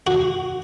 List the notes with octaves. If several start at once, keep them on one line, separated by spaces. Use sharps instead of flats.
F#4